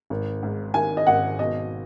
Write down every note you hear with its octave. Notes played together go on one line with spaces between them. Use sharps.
G#1
G#2
D#3 G#5
D#5
G#1 F#5
B2 D#5